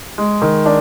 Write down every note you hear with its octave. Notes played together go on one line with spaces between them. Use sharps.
G#3
D#3
D4